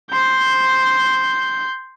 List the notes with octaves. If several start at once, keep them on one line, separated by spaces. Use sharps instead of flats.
C6 G6